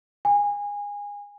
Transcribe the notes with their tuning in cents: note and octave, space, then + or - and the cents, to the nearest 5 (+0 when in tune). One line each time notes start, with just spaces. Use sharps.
G#5 -25